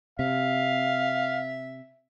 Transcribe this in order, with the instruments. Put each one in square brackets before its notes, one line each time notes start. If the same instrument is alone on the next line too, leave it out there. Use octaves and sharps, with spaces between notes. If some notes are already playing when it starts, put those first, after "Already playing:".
[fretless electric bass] C3 [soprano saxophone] E5 [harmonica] F5